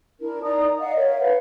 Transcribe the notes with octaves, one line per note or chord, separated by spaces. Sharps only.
D4 E4 A#4
D#4 D5 A#5 D#6
D5 D#5 F5 F#5
A#4 C#5 E5 F5
B4 F5 F#5